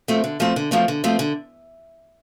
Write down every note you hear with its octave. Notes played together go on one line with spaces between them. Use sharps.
F3 A3 C4
D3
F3 A3 C4
D3
F3 A3 C4
D3
F3 A3 C4
D3